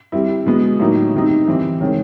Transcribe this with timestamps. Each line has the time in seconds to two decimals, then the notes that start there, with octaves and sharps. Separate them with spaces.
0.12 G3 C4 E4
0.46 B2 G#3 B3
0.80 A2 F#3 A#3 D#4
1.14 D#3 G3 C4 D#4
1.47 E3 G3 C4
1.80 C3 D#3 G#3 C#4